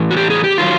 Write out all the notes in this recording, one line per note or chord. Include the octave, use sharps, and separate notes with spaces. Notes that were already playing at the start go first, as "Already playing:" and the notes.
Already playing: A2 E3
F#4
G4
G#4
G4
D#3 F#3 F4